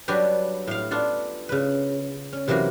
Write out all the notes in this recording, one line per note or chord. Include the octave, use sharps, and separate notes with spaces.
F#3 G3 D4 F#4 G4 B4
A2 F5
B3 D4 F4 A4
C#3 B4
C#4
C3 E3 F#3 A#3 F#4